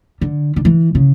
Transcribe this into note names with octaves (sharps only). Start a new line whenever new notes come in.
D3
D3
E3
C#3